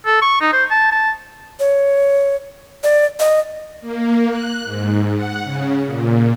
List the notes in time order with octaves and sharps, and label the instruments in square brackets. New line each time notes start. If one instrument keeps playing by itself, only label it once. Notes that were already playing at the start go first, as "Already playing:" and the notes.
[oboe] A4
C#6
D#4
C5
A5
A5
[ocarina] C#5
D5
D#5
[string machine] A#3
F#6
G#2
F#5
C#3
A#2